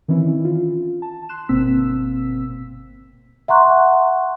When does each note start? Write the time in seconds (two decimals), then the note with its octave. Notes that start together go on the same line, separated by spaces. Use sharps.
0.08 D#3 E3 C4 C#4 E4
0.45 F4
1.02 A5
1.29 C6 F#6 E7
1.49 G1 B2 A#3 C4 E6 B6
3.48 E5 F#5 A#5 C6 C#6 F#6